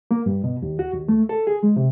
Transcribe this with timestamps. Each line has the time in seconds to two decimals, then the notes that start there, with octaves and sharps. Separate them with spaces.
0.11 A#3
0.26 G2
0.44 B2
0.62 D#2
0.79 F#4
0.93 D#2
1.08 A3
1.29 A4
1.47 G#4
1.63 G#3
1.76 C3